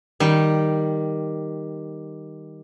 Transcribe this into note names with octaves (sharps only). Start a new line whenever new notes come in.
D#3 G3